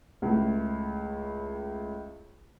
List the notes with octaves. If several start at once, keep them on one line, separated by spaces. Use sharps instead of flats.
C#2 A2